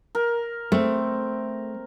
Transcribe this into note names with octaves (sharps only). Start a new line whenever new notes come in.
A#4
A3 C4